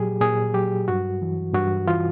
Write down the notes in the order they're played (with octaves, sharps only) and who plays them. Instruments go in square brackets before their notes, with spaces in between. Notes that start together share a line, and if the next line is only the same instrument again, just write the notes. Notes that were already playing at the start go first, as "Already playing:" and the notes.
Already playing: [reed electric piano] A#2 F#3 G4 G#4
A#2 G#4
F#3 G4
G2 F#4
E3
G2 F#4
E3 F4